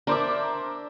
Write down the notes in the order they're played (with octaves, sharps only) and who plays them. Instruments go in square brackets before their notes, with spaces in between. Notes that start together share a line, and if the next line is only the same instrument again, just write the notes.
[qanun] D4 E5 [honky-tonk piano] A#4 C5 D6